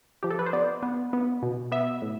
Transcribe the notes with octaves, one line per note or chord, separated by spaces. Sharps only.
F3 G4
A4
B4
C5
B3 D5
B3
B3
B2
B3 E5
A2